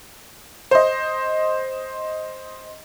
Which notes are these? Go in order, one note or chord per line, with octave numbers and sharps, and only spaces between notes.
C5 D#5